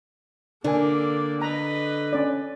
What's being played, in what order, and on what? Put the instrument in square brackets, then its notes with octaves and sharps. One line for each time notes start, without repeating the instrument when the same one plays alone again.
[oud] D3 [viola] A#3 D5 [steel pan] D4 A#4 G#5
[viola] B4 D#5 [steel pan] A#5
[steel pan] C#4 D5